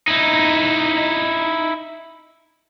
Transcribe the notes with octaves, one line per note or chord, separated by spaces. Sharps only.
D#4 E4